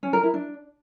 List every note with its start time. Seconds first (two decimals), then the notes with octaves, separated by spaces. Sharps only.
0.03 C#4
0.13 A#4
0.23 E4
0.34 D4